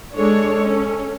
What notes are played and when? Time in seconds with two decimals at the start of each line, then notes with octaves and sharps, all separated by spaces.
0.16 G#3 D4 A4 C#5
0.64 C#4